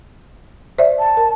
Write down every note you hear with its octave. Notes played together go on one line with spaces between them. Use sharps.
C5 D5 E5
A5
A#4